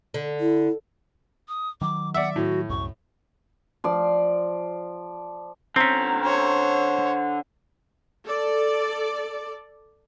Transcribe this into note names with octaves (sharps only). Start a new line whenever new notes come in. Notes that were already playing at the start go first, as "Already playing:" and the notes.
D3
E4
D#6
D#3 F#3 D6
D5 E5 F#5
A2 F#4
C2 F#2 C#6
F3 D5
D3 C4 C#4 A#5
C5 C#5
A4 D5